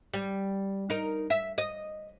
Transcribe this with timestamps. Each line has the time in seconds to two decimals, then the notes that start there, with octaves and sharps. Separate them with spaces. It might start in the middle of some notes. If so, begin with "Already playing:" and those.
0.14 G3
0.90 D#4 A#4
1.30 E5
1.58 D#5